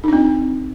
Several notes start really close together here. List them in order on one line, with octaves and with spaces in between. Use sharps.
D#4 D4 C4